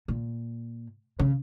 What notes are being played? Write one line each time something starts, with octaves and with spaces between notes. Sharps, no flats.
A#2
C#3